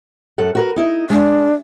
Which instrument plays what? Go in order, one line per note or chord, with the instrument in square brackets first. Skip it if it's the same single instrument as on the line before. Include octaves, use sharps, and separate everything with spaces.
[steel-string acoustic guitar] F#2 A4 F#5
F#4 A#4 B4
D#4 E4 D#5
[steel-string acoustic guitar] G#3 [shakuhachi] D4